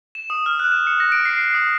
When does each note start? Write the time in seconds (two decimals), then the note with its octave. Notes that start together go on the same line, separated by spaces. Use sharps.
0.15 E7
0.30 D#6
0.46 F6
0.59 F#6
0.72 E7
0.87 C#7
1.00 A#6
1.12 D7
1.25 C7
1.41 C7
1.54 D#6